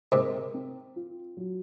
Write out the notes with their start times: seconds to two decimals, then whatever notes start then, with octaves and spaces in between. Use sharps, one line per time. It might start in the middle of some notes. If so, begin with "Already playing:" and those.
0.12 G#2 C3 A#4
0.54 C4
0.96 F4
1.37 F#3